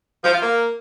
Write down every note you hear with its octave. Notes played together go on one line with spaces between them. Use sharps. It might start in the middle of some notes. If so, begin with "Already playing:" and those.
F3
F4
A#3